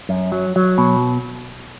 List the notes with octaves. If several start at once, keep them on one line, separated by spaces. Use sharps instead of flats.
F#2
F#3
F#3
B2